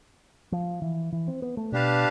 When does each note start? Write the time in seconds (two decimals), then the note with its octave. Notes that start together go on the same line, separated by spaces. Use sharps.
0.52 F3
0.82 E3
1.13 E3
1.28 C4
1.42 B3
1.57 A3
1.72 B2 D4 G4 B4 F5 A5